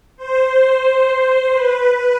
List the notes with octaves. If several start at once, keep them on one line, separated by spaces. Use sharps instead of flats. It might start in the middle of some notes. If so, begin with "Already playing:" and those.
C5
B4